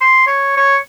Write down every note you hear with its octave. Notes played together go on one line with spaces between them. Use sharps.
C6
C#5
C#5